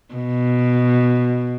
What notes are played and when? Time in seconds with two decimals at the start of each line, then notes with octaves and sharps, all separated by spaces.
0.14 B2